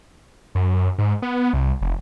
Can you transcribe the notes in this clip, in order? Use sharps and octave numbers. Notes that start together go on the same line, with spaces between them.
F#2
G#2
B3
C2
F1